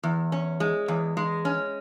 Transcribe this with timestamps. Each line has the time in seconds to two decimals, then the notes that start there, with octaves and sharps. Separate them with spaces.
0.03 E2
0.32 C#4
0.60 G#3
0.88 E2
1.17 G#3
1.45 C#4